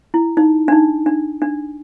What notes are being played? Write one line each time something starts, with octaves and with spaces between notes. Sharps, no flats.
E4
D#4
D4
D#4
D4
D4